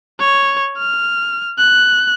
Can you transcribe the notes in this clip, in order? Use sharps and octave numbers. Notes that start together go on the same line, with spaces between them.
C#5
F6
F#6